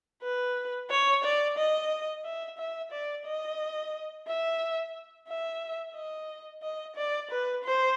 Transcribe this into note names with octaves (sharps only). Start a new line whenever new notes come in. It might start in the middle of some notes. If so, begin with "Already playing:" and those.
B4
C#5
D5
D#5
E5
E5
D5
D#5
E5
E5
D#5
D#5
D5
B4
C5